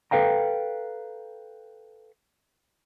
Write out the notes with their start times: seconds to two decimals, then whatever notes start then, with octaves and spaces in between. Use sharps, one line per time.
0.11 A4 B4 F5 G5 A#5